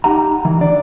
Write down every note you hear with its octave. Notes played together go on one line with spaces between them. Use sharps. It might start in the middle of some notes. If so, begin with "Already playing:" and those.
D#4 G4 F#5 A#5
D#3 E3
D4 D5